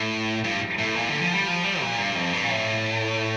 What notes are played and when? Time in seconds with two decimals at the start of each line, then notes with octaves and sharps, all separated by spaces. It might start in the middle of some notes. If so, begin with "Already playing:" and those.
Already playing: A2
0.44 G2
0.78 A2
0.96 A#2
1.09 D3
1.21 F3
1.34 G3
1.48 F3
1.64 G3
1.82 A#2
1.98 G2
2.15 F2
2.33 G2
2.43 A#2
2.49 A2